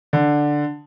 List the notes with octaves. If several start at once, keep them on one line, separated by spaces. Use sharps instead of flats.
D3